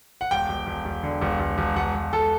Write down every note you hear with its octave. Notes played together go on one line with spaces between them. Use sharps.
F#5
E1 G5
E1
E1
E1
D3
E1
E1
E1
E1 F#5
E1
E1 A4